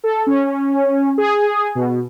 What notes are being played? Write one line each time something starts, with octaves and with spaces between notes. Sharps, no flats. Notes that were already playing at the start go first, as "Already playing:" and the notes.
A4
C#4
G#4
B2